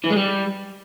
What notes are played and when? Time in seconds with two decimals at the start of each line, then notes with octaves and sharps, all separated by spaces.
0.04 E3
0.10 G#3
0.17 G3